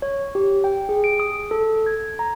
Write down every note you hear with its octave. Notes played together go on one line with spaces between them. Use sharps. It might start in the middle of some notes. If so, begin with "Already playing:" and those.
C#5
G4
G5
G#4
D7
D#6
A4
G#6
A#5